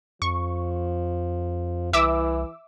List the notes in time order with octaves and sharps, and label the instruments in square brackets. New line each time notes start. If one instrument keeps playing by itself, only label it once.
[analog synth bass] F2 [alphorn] F3 [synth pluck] C#6
[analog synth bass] C2 [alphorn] E3 [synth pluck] E5 D6 E6